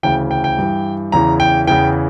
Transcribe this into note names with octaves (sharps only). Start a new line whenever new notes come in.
D2 C#3 E3 G5
G5
G5
G2 E3
E2 C#3 E3 A#5
G5
E2 C#3 E3 G5